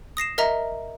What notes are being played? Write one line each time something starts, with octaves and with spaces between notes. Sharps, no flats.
D#6 A#6 C7 E7
A#4 D#5 E5 A#5